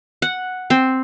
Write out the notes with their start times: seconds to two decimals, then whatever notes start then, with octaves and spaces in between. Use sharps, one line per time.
0.22 F#5
0.70 C4